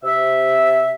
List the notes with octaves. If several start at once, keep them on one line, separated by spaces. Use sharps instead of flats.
C3 E5